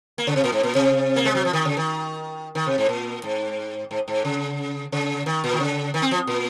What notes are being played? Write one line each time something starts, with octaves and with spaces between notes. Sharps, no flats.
A#3
C#3
C3
A#2
G#2
A#2
C3
A#3
G#3
F#3
F3
D#3
C#3
D#3
D#3
C3
G#2
A#2
G#2
G#2
G#2
C#3
C#3
D#3
A#2
D#3
C#3
D#3
C4
F3
A#2